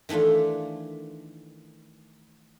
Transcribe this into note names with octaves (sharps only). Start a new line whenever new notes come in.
D#3 E3 A3 D4 F4